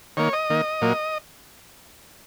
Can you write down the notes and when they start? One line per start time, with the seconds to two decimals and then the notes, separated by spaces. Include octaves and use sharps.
0.17 D#3 A#3 C#5
0.33 D#5
0.50 D#3 A#3
0.82 A#2 F#3 A#3